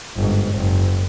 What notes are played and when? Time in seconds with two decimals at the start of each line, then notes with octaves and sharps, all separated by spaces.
0.16 G1 G#2
0.54 F#1